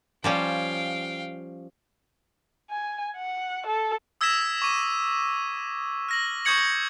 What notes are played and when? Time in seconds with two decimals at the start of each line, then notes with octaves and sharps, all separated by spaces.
0.24 F3 G3 C#4 F5 G5
2.70 G#5
3.16 F#5
3.67 A4
4.21 D#6 E6 G#6 A#6 B6 E7
4.62 C#6 D6 D#7
6.09 F6 A#6 F#7
6.45 C#6 D#6 G6 G#6 C#7 F#7